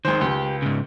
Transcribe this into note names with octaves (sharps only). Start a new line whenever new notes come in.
G#1 D#3 G#3 C5
C#2 G4
G#2 C#3